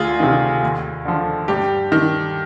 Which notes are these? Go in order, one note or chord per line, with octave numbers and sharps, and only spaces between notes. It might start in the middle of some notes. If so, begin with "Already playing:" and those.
Already playing: D2 F4 G#4
C3 D#3
D#2
D3 F3
G2 G4
D#3